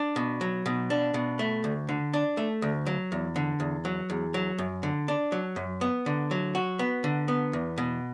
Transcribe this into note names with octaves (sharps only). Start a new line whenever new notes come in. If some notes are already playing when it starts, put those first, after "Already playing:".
Already playing: D4
B2
F#3
B2
D4
B2
A3
D2
D3
D4
A3
D2
F#3
E2
D3
E2
F#3
E2
F#3
F#2
D3
D4
F#3
F#2
B3
D3
F#3
F#4
B3
D3
B3
E2
B2